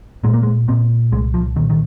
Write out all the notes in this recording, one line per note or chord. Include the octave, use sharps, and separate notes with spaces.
A#2 G#3
A#3
G#3
A#2 C4
C2 G#3
F3
A#2 D#3
D#3